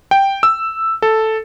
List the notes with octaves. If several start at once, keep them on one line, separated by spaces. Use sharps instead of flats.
G5
E6
A4